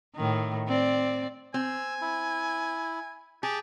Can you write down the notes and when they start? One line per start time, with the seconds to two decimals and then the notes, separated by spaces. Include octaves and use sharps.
0.16 A2 D#3
0.68 C4 D5
1.54 C4 G#5 E6
2.01 E4
3.43 G4 G#4 A5